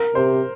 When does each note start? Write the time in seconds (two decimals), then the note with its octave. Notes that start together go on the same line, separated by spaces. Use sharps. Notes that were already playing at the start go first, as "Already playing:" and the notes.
Already playing: A#4
0.15 C3 C5